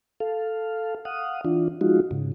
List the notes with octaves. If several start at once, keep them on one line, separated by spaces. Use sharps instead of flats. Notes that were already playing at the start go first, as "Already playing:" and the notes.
A4 F5
F5 F#5 D#6
E3 D4 F4
F3 G#3 D#4 F4 F#4
G#2 C#3